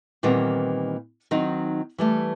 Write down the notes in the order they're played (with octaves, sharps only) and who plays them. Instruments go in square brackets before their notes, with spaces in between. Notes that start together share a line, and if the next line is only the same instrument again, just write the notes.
[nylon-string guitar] A#2 D#3 E3 G3 B3 C4
D#3 F#3 C4 D#4
E3 G3 A3